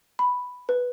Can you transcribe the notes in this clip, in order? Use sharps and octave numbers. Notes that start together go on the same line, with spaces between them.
B5
B4